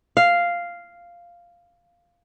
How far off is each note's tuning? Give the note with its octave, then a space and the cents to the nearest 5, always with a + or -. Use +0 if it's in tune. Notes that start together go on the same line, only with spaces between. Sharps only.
F5 -5